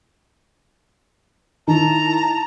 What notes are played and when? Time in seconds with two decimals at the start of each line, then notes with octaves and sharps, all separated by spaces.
1.68 D#3 E4 A5 A#5